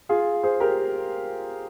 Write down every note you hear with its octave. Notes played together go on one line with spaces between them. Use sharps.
F4 G#4
G#4 C5
G4 A#4